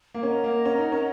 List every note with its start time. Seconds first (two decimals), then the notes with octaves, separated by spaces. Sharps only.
0.14 A#3
0.23 C#4 A#4 D#5 F#5 A#5
0.44 A#3
0.65 C#4
0.78 D#4
0.92 C#4